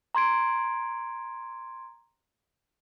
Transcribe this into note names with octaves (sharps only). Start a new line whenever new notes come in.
A#5 C6 G#6 D7